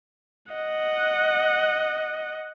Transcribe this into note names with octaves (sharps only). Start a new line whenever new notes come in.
D#5 F#5